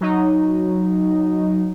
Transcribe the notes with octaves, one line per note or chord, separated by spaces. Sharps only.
F#3 D#4